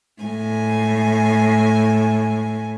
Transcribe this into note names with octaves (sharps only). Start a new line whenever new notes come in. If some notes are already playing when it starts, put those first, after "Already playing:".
A2 G#5